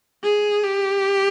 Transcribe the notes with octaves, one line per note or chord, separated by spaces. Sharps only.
G#4
G4